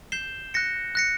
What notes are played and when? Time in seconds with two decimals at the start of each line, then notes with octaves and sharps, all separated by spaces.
0.12 G6 C7 E7 G7
0.54 F#6 A#6 C#7
0.95 F#6 A#6 C#7